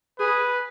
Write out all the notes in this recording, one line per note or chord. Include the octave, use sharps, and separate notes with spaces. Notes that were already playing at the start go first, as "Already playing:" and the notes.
G#4 B4